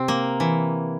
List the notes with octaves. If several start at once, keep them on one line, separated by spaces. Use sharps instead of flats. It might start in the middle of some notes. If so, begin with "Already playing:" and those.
Already playing: C3 C4
A#3
E3